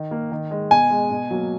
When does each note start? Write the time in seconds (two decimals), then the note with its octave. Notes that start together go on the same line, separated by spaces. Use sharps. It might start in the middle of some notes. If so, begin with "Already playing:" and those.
Already playing: D#3
0.11 A#3
0.32 D#3
0.51 G#3
0.71 B2 G#5
0.90 G#3
1.11 B2
1.31 F#3 A#3